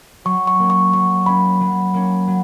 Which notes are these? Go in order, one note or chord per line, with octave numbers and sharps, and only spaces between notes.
F#3 C#6
C#6
A#3 C#4
C#6
F#3 C#6
A#3 C#4 B5
F#3
A#3 C#4
F#3